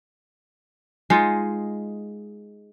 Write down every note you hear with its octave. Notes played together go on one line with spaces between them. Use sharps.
G#3 D#4 F4